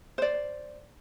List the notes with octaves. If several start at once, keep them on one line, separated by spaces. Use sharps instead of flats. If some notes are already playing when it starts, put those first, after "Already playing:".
C5 D5